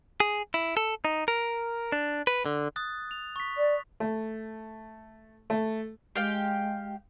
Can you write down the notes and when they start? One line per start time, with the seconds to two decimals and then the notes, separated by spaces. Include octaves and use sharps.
0.20 G#4
0.54 E4
0.77 A4
1.05 D#4
1.28 A#4
1.92 D4
2.27 B4
2.46 D3
2.76 D#6 F#6 A6
3.11 F7
3.36 C#6 B6
3.58 D5
4.00 A3
5.50 A3
6.16 G#3 G4 F5 G5